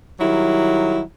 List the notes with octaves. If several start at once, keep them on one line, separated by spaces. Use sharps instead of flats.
D#3 F#3 G3 E4